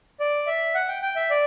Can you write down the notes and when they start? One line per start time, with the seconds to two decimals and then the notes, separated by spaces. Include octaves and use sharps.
0.20 D5
0.47 E5
0.75 F#5
0.88 G5
1.02 G5
1.16 E5
1.30 D5